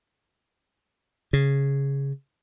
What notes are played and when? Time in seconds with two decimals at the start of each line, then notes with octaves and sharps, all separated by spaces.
1.33 C#3